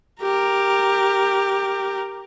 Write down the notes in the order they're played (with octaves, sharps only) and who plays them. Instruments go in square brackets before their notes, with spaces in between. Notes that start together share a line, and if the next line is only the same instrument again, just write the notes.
[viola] G4 A#4